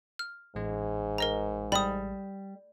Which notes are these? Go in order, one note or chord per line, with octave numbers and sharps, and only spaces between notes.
F6
A1 G#2 G#3
A#4 D#5 A#5
G3 B5 D#6